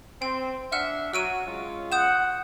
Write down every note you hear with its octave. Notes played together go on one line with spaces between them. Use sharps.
C4 G5
D4 E5 F#5 F6
F#3 F#4 E6 D7 D#7
G#3 C#4 F4
F#5 D#6 G6 E7